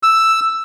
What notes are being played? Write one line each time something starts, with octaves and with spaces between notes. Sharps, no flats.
E6